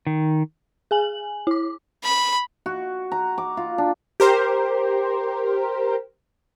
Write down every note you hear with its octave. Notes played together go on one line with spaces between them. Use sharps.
D#3
G#4 G#5 F#7
E4 D6
B5
F#4
A#5
D6
F4
D4
G4 A#4 C5